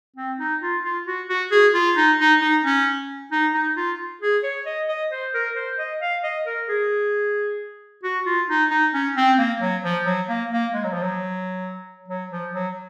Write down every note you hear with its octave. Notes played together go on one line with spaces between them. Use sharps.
C4
D#4
F4
F4
F#4
F#4
G#4
F4
D#4
D#4
D#4
C#4
D#4
D#4
F4
G#4
C#5
D#5
D#5
C5
A#4
C5
D#5
F5
D#5
A#4
G#4
F#4
F4
D#4
D#4
C#4
C4
A#3
F#3
F3
F#3
A#3
A#3
G#3
F#3
F3
F#3
F#3
F3
F#3